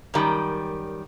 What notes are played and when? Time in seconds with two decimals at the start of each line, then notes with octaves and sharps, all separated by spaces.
0.14 F#2 D#3 G3